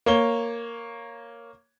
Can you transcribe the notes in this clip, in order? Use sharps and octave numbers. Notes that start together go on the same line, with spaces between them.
A#3 C#5 G7